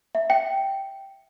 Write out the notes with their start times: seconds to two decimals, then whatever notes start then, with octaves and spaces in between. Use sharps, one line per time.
0.15 E5
0.30 G5